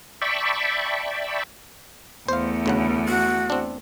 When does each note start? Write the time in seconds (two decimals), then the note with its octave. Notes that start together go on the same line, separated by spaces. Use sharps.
0.22 D5 E5 G5 A5 B5 C#6
2.28 E2 A3 C5 F5
2.66 D2 C#3 F#5
3.08 F#4
3.50 C4 D4